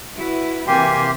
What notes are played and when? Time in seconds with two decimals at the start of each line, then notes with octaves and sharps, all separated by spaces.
0.15 E4 F#4 B4
0.67 C3 E3 A#3 G4 E5 G5 G#5 C6